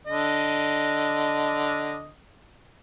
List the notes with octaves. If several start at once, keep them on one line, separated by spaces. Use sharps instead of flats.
D3 D#5